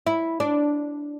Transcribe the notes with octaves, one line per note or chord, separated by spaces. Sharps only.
E4
D4